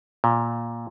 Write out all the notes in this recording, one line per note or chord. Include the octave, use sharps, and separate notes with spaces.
A#2